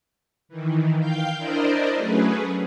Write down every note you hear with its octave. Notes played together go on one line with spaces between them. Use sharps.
D#3 E3
F5 G5 G6
D4 E4 A#4 C5 D5 D#5
F#3 A3 C#4 G#4 B4